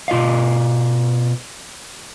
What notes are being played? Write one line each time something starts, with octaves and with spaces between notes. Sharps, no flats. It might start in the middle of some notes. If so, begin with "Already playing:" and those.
B2 F4 D#5 F5